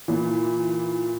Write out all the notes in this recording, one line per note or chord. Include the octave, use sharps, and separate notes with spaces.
A#2 E3